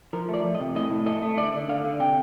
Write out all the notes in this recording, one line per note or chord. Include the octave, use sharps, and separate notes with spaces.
F3 A#4
A3
D5
F3
D#5
C3
A2 D#5
A2
A3 D#5
A3
D3 D5
D3
D3 F5
D3
C3 G5